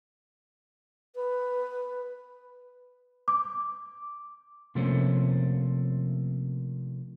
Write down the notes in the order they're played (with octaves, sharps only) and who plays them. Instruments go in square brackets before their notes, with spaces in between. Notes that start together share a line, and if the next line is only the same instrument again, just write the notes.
[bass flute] B4
[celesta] D6
[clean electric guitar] C3 F3 A3 A#3 C#4 C5